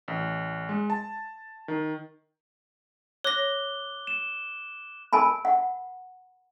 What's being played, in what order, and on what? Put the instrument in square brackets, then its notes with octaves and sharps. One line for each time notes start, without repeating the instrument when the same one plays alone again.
[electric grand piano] A1
G#3
A5
D#3
[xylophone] C#5 A#6 [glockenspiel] D6 F#6 G7
[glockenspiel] E7
[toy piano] A#4 G#5 A5 B5
F#5